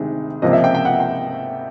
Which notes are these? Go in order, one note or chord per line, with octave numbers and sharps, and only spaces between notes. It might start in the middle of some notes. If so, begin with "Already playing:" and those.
Already playing: D2 C3 D#3 G#3
C#2 C3 F3 A#3 D#5
E5
G5
G5
F#5
G5